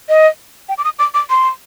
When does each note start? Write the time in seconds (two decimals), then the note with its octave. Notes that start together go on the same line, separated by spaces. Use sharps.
0.09 D#5
0.69 G5
0.78 D6
0.85 D#6
0.99 D6
1.14 D6
1.30 C6